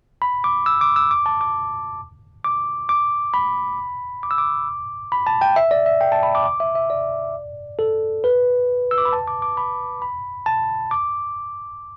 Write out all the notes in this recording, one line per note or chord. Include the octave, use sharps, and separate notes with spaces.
B5
D6
E6
D6
E6
D6
A5
D6
D6
D6
B5
D6
E6
D6
B5
A5
G5
E5
D5
E5
G5
A5
B5
D6
D6
E5
E5
D5
A4
B4
E6
D6
B5
A5
D6
D6
B5
B5
A5
D6